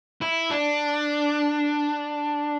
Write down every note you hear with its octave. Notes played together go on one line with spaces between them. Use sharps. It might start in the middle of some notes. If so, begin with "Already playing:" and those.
E4
D4